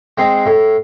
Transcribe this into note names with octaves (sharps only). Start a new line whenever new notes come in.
G#3 C4 D#4
A2